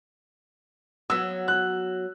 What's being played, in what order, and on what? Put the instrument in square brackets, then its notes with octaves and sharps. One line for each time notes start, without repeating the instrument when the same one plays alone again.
[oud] F#3 B3 [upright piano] E6
[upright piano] F#6